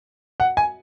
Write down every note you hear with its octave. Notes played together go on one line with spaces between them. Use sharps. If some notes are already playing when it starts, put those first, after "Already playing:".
F#5
G#5